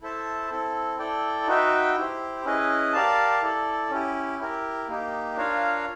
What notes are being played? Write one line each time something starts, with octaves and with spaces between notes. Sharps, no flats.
E4 A4 C5 E5 A5
C4 E4 A4
E4 A4 D5 G5
D#4 F#4 B4 E5 G5
E4 G4 C5
C#4 E4 G#4 B4 D#5
G4 A#4 D5 F5 A5
E4 A4 D5
C#4 E4 G4
E4 G4 A#4
A#3 D#4 G4
D4 F4 A#4 C#5 F5